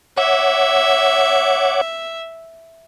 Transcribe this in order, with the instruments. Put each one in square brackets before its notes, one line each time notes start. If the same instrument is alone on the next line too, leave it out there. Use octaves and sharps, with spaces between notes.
[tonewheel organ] C#5 F#5 D6 [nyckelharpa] E5